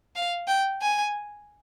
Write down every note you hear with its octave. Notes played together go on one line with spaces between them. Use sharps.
F5
G5
G#5